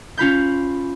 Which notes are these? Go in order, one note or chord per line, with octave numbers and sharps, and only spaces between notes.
C#4 F4 B5 G6